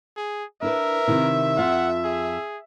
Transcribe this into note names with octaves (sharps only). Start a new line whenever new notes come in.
G#4
D4 E4 A#4 B4 E5
C3 D#3 E4
F2 F4 F#5
G#4